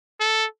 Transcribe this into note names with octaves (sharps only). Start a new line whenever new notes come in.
A4